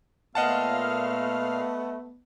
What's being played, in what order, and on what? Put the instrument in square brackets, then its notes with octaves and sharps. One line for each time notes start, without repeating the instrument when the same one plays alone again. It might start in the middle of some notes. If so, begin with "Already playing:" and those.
[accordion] A#2 F5 F6 [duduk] A3 [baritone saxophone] B3 [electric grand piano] D#5 F#5 A5